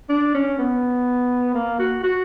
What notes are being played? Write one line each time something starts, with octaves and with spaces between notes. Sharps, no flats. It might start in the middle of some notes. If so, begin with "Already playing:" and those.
D4
C#4
B3
A#3
F#4
F#4